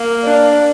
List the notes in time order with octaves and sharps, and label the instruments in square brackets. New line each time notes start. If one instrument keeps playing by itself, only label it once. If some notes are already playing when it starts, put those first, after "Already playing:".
Already playing: [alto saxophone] A#3
[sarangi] D4